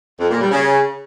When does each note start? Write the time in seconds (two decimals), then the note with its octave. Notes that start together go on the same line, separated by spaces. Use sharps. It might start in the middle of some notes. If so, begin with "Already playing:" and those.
0.20 F2
0.30 A#2
0.41 G3
0.51 C#3